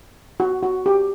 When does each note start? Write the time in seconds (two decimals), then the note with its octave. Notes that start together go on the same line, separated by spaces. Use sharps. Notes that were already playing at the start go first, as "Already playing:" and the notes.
0.40 F#4
0.63 F#4
0.86 G4